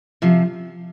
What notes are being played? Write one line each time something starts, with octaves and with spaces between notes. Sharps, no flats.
C3 F3